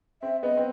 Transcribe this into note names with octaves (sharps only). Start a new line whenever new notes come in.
C4 E5
B3 D#5
C4